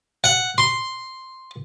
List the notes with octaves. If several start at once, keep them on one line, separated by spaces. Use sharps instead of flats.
F#5
C6